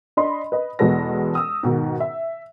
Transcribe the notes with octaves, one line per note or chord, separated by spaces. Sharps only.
D4 D#5 B5 C6
B4 D#5
E2 B2 G#3 A4 B4 A#6
D#6 E6
G#2 B2 D#3
E5